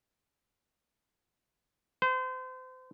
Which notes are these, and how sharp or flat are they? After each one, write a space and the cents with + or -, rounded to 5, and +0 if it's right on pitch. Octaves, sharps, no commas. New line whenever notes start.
C5 -35